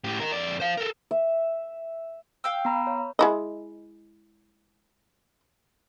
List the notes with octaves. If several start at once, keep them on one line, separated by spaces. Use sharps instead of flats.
A2 G4
D#4 A#4
F2 D5
C5 F5
A4 A#4
E5
F5 G5 E6
B3 A#5 B5
C#5
G#3 E4 D#5